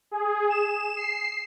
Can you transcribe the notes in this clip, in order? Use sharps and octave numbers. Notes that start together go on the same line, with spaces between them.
G#4
E7
C7